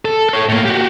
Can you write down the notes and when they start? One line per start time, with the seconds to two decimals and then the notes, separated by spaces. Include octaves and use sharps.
0.05 A4
0.29 A4 C#5
0.49 A2 A#3
0.65 F#4 G4